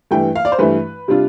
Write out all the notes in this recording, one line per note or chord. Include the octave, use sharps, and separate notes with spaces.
G2 E3 A3 G5
F5
D5
C5
G2 E3 A3 B4
C3 G3 D4 F4